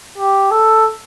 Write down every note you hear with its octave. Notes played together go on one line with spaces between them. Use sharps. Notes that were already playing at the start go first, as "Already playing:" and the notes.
G4
A4